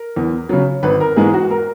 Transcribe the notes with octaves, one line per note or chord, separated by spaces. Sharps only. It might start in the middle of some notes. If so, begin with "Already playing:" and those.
Already playing: A#4
E2
C#3 F#3
G#1 B4
A#4
G#2 E3 G#3 G#4
F#4
A#4